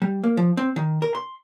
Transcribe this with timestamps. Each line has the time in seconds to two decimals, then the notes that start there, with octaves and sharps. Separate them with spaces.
0.02 G3
0.24 A#3
0.37 F3
0.57 C4
0.76 D#3
1.02 A#4
1.15 C6